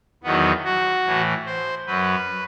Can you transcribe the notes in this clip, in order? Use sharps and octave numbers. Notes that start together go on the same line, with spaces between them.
E2 D#3 F#3 B3
F#4
A2 E3
C5
F#2 F#3 B4